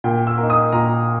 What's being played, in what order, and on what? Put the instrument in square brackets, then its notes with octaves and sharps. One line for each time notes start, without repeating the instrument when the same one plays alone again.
[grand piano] A#2 G5
E6
A#3 D#4
D#6
A#2 A#5